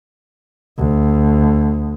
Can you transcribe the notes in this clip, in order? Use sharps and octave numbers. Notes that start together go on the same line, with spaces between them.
D2